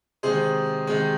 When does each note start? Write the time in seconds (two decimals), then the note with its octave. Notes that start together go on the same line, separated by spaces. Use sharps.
0.23 C3 D#3 G#3 G#4 C5
0.87 C3 D#3 G#3